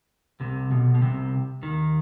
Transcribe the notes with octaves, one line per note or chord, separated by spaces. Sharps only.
C2 C3
B1 B2
B2
C2 C3
D#2 D#3